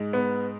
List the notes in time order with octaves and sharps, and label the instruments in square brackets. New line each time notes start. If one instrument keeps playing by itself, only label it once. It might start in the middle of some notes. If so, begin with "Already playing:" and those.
Already playing: [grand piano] G#2 G#3 D#4
[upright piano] B3